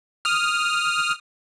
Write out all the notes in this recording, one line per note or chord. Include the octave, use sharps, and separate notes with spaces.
D#6 F6